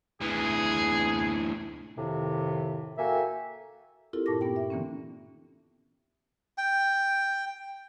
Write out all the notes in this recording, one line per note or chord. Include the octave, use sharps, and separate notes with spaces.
D2 E3 G#4
F2 A2 C3 D#3
A#3 F#4 A4 E5 G5 G#5
C4 E4 F4 G4 A4 A#4
G2 A#2 A5 C#6 D6 A#6
A#3 B3 D#4 G4 G5
E5
D3 E3 A#3 C4 C#4
G5